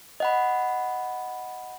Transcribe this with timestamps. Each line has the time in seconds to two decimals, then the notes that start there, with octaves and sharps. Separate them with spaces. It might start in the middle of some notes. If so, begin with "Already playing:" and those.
0.20 D#5 F#5 B5